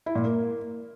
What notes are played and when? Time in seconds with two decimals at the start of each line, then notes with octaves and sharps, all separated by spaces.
0.06 E4
0.15 A#2
0.24 A#3